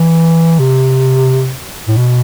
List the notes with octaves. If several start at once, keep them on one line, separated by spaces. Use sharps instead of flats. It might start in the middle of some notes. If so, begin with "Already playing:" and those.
Already playing: E3
C3
A2
B2